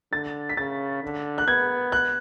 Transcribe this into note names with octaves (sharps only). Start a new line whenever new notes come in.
D3 A6
B6
C#3 A6
D3
F#6
B3 G#6
F#6